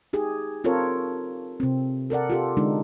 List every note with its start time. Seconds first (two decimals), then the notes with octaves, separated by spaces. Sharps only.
0.13 D#4 G4 G#4
0.64 C4 F4 A4 A#4 C#5
1.60 C3 C4
2.10 A4 A#4 D5 F#5
2.30 F4 G4 A4
2.57 D3 G#3 D4 D#4